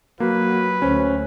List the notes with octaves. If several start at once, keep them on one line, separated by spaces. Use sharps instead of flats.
F#3 A#3 F#4 B4
D2 C#4 C5